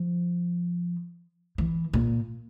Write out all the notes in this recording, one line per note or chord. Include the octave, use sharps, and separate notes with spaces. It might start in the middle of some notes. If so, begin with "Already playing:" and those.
Already playing: F3
E3
A#2